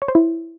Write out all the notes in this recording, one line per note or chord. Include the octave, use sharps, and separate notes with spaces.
C#5
C5
E4